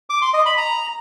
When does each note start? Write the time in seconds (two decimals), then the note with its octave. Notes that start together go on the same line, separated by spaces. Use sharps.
0.10 D6
0.22 C6
0.34 D#5
0.46 B5
0.58 A#5